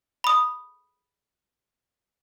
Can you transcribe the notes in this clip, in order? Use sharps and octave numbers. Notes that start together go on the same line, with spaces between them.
B5 D#6